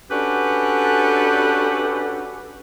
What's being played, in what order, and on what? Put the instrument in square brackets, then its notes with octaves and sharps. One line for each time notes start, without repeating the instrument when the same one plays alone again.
[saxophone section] C#4 D4 F#4 G4 A4 B4